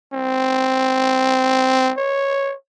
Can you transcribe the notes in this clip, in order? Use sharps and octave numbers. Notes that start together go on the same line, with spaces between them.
C4
C#5